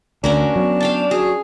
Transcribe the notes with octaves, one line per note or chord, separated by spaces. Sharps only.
D2 C#4 D4 F#4 A#4
F#3 B3
F5 G5 A5
F#4 G#4